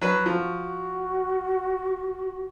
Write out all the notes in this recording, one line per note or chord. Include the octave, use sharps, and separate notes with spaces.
F#3 B4
F3 F#4